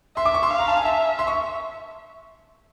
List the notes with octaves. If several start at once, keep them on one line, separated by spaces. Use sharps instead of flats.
E5 C6
D6
C#6
C6
F5
A#5
A5
G#5
E5 A5
C6
C#6